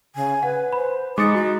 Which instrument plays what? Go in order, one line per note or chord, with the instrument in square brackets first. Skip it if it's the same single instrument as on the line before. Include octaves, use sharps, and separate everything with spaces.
[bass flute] C#3 [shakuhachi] G#5
[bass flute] B4 [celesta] F#5
[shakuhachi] C5 [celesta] B5
[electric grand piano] G#3 C#7 [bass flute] D#4 [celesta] D6 A6 [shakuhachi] D#6
[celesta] F#4 [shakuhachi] D#5